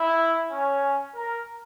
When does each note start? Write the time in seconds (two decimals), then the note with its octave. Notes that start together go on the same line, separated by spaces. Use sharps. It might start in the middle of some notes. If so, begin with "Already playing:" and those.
Already playing: E4
0.51 C#4
1.14 A#4